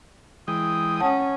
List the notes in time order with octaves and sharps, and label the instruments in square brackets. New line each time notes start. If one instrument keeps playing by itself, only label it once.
[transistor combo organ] E3 G#3 G5 [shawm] D#6
[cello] C#4 [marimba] F#5 A5